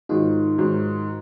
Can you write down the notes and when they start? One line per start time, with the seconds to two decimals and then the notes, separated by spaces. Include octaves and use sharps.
0.09 G#2 D#3 F#3 D#4 F4
0.58 G#2 D#3 F#3